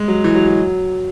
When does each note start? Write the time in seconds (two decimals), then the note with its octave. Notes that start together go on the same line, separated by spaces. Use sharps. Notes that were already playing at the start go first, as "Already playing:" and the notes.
Already playing: G#3
0.08 F#3
0.24 E3
0.35 F#3
0.46 F#3